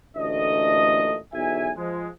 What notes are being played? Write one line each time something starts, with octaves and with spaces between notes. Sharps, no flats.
A1 D2 A#2 A3 D4 D#5
B1 E2 E5 G#5
F3 G#3